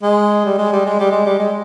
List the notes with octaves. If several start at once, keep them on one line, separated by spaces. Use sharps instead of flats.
G#3
G3
G#3
G3
G#3
G3
G#3
G3
G#3